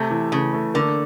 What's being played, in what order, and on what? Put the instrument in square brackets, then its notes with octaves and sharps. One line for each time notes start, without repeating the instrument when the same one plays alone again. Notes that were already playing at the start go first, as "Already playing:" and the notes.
Already playing: [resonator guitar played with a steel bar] C3 [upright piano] A3
[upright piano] E3
[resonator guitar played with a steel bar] C#3 [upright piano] A3
[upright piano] A3
[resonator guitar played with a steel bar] D3 [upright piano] A#3